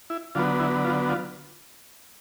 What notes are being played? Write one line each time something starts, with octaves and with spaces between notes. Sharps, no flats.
E4
D3 F#3 B3 F4
E4
F4
F4